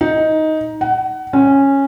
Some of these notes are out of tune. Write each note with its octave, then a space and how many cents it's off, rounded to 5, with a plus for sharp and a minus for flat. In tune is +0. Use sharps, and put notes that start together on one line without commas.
D#4 +10
F#5 +25
C#4 -10